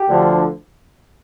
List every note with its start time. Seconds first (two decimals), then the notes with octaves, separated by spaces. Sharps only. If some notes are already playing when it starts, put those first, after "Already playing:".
Already playing: G4
0.08 D2 D3 F3